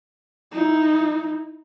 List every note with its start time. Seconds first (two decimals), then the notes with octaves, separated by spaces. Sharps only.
0.52 D#4 E4